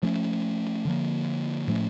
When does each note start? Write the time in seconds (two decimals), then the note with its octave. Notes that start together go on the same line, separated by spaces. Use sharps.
0.03 F3 A3 C#4
0.85 D3 F3 A#3
1.68 A2 F3 A3 C#4